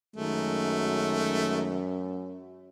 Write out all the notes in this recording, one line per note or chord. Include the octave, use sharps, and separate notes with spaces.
F#2 D#3 G#3 A3